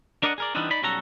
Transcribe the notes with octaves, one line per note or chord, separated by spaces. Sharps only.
D4 A#4 D5 D#5 F#5
G#4 A#4 D5
E3 G3 B3 C4 D4 D#4
D#4 D5 B5
B1 G3 C#4 F#4 A4 A#5